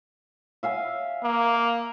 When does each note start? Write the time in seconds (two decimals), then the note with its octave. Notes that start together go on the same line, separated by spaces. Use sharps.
0.63 E5 F5 G#5
1.24 A#3